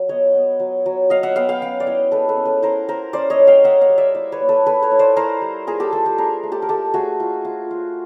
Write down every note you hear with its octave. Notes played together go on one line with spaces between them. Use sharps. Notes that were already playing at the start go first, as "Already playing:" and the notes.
Already playing: F#3
B3 C#5 D#5
B3
F#3
F#3
F#3 D#5 F5
E5 F#5
B3 F5 G5
F5 G5
C#4 F5 G5
D5
E4 C#5 D#5
G#3 A4 B4
A4 B4
C#4
A4 B4
E4 A#4 C5
E4 A#4 C5
C#4 C5 D5
C#5 D#5
G#3
F5 G5
C#4 E5 F#5
D#5 F5
G3
D5 E5
E4 C5 D5
B4 C#5
A#3
A4 B4
E4 A4 B4
B4 C#5
E4
C5 D5
E4 A#4 C5
G3
F4 G#4 A#4
G4 A4
A3 G4 A4
G4 A4
D4 G#4 A#4
A3
G4 A4
A#4
A3 G4 A4
A3 F#4 G#4
F4
F4
F4